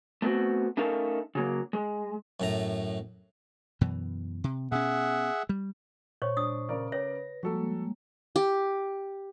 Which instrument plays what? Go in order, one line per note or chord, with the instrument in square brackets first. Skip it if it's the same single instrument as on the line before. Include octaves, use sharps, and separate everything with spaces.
[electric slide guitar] A3 B3 C4 F#4
A3 C#4 D#4 A4 A#4 F5
C#3 F#3 A#3
G#3
[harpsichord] F#2 A2 A#5
[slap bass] F#2 B2 E3
C3
[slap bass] B2 C#4 [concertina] G#4 E5 F#5
[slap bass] G3
[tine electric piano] A#2 C5 C#6 [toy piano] C#5
[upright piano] D4 [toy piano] D#6
[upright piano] C#3 A#4 D5
[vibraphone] B4 [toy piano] C#5 [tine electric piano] A#6
[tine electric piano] F3 [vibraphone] G3 G#3 A#3 [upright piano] F#4 A4
[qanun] G4